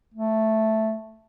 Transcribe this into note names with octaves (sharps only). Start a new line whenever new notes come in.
A3